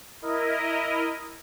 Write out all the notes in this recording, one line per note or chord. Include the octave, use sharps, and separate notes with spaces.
E4 A#4 D#5